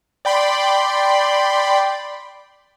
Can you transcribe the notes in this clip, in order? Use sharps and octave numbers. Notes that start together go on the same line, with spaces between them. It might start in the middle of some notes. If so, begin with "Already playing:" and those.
D5 G5 B5 C6